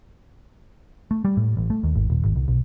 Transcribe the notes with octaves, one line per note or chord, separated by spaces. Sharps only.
A3
G3
A2
A1
A3
D#2
G#1
D#1
G#1
C2
B1